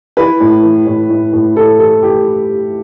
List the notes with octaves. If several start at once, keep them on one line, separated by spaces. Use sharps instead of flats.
E3 B4
A2
E3
A2
A2
A2
A2 A4
E3 A4
A2 G4